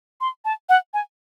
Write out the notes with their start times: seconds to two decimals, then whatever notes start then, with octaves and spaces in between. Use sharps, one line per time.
0.21 C6
0.45 A5
0.69 F#5
0.94 G#5